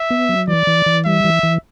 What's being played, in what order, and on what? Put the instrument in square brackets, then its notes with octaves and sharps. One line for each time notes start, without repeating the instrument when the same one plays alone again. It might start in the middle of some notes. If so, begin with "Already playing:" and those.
Already playing: [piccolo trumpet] E5
[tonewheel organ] B3
F#3
[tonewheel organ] E3 [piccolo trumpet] D5
[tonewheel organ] E3
E3
[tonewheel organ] G3 [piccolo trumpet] E5
[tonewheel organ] E3
E3